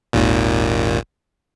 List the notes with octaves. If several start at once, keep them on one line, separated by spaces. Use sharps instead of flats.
G#1 D#2 A#2